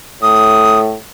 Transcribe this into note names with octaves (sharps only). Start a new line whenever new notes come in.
A2 D#6